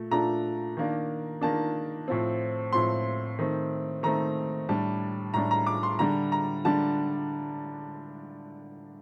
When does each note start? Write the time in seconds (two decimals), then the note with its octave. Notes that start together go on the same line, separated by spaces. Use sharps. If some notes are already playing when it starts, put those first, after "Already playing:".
Already playing: A#2 A3
0.11 A#2 A3 D4 A#5
0.77 D#3 A#3 D4
1.41 D#3 A#3 D4 A5
2.08 A2 F3 C4
2.73 A2 F3 C4 C6
3.39 D#3 A3 C4
4.03 D#3 A3 C4 A#5
4.69 A2 G3 D4 A5
5.34 A2 G3 D4 A#5
5.51 A#5
5.67 D6
5.83 C6
5.99 D3 G3 D4 A#5
6.32 A#5
6.65 D3 G3 D4 A5